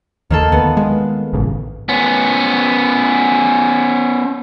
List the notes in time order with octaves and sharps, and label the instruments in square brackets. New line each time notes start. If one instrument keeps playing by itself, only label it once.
[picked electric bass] D#2 [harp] D#3 A#3 A4
[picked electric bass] D2 [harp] B3
[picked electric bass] G#3
A1 G#2 C#3
[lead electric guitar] B3 C#4